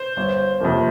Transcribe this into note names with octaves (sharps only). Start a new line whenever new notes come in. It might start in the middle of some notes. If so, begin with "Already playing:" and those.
Already playing: C5
G1
F2 C3 F3 A#3